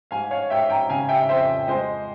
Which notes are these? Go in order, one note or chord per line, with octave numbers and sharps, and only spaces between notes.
G#2 F5 G#5
C#5 F5
G#2 E5 G5
G5 A#5
C#3 F5 G#5
E5 G5
F2 C5 E5
G#3 C5